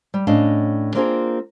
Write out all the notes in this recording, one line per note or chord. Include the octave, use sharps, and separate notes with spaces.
G3
A2 C#4 D4 D#5 F5
A#3 C4 D4 F4 G#4 A#4